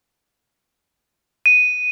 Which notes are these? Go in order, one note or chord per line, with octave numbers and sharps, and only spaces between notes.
D#7